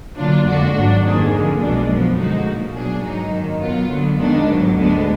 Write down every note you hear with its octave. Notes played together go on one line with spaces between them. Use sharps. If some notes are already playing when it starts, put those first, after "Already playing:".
D3 F#3 A#3 D4 F4
F2 D3 G#3 D4 F#4
G#1 G#2 F#3 D4
F2 D#3 A#3 D4 G#4
D3 F3 A#3
B1 B2 G#3 D4
F#2 F3 B3
D3 G#3 D#4 F#4
A#2 F3 A#3
B2 F#3 D4 G#4
G#2 F#3 A#3 D#4
F#2 D#3 A#3
B2 F#3 B3 F4
D3 F#3 B3
F2 D#3 G#3 B3 D4
G#1 G#2 F#3
D2 D3 G#3 B3 D4